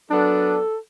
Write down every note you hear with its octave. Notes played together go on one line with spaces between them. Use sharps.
F#3 B3 D4 A4